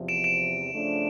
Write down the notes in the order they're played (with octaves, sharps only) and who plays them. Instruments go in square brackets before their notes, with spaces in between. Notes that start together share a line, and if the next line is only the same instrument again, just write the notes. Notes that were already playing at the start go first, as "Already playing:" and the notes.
Already playing: [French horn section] E2 C3 F3
[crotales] D7 E7
D7 E7
[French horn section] C#3 F3 A3 D4